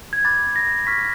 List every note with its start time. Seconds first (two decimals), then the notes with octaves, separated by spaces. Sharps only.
0.13 G#6
0.25 B5 D6 F#6 A6
0.56 A#6
0.87 C#6 F6 B6